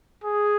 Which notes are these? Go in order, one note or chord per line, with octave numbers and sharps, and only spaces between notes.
G#4